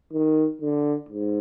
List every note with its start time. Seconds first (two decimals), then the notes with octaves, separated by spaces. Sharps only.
0.13 D#3
0.62 D3
1.09 G#2